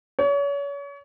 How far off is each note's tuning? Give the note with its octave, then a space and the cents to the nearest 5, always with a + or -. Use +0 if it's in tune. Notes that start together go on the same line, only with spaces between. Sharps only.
C#5 +35